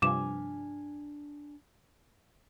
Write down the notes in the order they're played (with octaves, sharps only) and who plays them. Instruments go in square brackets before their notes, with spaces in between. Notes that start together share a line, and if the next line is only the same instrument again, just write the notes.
[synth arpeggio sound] G2 C3 F3 [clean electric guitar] D4 G#5 [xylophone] D6 E7